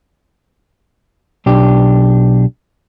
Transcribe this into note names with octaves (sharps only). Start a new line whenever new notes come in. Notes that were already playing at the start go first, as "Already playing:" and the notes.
B1 D4 G4